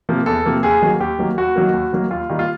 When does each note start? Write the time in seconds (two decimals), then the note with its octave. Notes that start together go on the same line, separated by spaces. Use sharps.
0.09 C3 F3 A#3
0.26 E2 A4
0.46 C3 F3 A#3
0.63 D#2 G#4
0.81 D#3 F#3 A#3
1.00 D#2 G4
1.18 D#3 F#3 A#3
1.38 D#2 F#4
1.55 D#3 F#3 A#3
1.74 D#2
1.92 D#3 F#3 A#3
2.11 D#2 F4
2.29 D#3 G3 A#3
2.39 F4